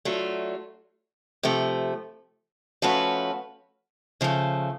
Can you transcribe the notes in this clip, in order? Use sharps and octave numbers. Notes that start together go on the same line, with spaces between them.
F#3 A3 D4 F4
C3 F3 A3
F3 A3 C#4 F#4 B4
C#3 F3 A3